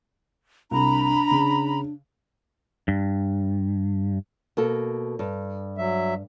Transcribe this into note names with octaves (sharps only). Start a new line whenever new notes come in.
C2 C3 D4 A#5 B5
C#3
G2
B2 A#3 A4
G2
F#3 E5